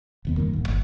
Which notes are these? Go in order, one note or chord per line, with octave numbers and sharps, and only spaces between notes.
E1 D#2 B3
G2 D#3 A#3
D1
G1